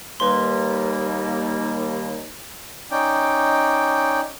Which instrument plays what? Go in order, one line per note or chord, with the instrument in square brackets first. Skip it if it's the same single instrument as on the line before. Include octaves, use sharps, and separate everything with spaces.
[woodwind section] D#2 G3 A#3 [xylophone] B4 C6
[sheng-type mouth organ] C#4 D#4 D5 G5